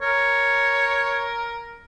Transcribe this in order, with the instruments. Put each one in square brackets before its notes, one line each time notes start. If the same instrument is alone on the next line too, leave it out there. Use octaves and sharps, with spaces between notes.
[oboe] A#4 [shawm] C#5